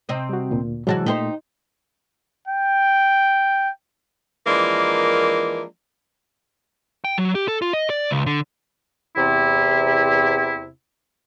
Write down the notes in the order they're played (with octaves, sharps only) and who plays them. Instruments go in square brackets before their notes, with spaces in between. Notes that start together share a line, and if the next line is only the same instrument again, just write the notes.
[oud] C3 C4 D#5
[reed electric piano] G3 F#4
D2 A#2
[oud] C3 E3 F#4 [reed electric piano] F#3 G#3 A5
[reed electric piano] A#2 A3 [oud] D#4 G4 C5
[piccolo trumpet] G5
[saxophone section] E3 F3 G#3 A#3 D4 A#4
[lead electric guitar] G5
F#3
G4
A4
F4
D#5
D5
C#2
D3
[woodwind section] E2 C3 E4